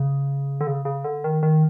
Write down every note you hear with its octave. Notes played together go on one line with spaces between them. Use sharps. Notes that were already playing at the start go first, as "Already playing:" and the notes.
Already playing: C#3
D3
C#3
C#3
D3
D#3
D#3